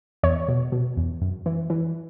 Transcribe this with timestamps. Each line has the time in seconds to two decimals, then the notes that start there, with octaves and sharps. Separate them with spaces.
0.23 E2 C#5
0.48 B2
0.72 B2
0.97 E2
1.21 F#2
1.46 E3
1.70 E3